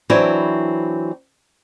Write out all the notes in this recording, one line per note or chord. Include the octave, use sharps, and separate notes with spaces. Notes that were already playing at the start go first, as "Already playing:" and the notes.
E3 F#3 C4 D4 E4 C#5